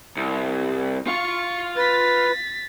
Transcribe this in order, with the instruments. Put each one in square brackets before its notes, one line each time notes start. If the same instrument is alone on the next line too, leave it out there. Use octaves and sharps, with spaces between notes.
[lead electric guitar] C2
[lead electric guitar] F4 F5 [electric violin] C#6
[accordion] B4 [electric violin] A6 B6